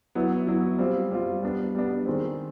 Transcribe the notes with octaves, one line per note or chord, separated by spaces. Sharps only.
F#3 B3 E4
F#3 B3 E4
G3 C4 F4
G3 C4 F4
G3 B3 D4
G3 B3 D4
D#3 G#3 C4